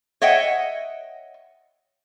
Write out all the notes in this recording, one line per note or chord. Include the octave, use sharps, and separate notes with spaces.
C#5 D#5 E5 F#5 G5